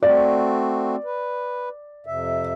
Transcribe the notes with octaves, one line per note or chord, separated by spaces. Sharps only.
A3 C4 F#4 D5
B4
F2 C3 E5